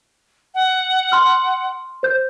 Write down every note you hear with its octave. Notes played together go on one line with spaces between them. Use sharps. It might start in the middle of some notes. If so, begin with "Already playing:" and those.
F#5
C6 F6
C5 G6